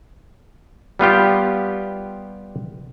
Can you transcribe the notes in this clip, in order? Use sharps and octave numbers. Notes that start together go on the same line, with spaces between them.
G3 B3 F4 G4